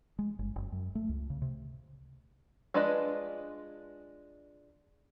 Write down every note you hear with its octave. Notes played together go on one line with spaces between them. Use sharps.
G#3
G1
F#1
F#2
A3
C#2
C#3
C3
G#3 D4 F4 B4 D#5